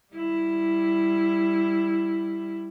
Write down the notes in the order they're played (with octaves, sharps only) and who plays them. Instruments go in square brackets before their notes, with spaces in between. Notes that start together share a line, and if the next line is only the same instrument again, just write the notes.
[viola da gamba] G3 E4